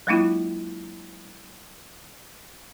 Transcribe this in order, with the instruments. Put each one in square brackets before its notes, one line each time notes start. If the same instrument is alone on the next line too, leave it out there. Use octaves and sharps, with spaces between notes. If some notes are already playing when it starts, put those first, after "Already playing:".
[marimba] F#3 G#3 A#3 D4 E4 F4